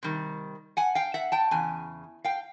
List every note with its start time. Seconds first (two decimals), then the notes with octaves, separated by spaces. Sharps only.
0.03 C3 D#3 G3
0.77 F#5 G#5
0.95 F5 G5
1.14 E5 F#5
1.32 G5 A5
1.51 E2 C#3 G#5
2.25 F5 G5